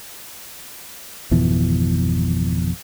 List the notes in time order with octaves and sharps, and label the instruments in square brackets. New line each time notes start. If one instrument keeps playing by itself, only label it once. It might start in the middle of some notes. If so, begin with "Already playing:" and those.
[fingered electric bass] G#1 F2 B2 E3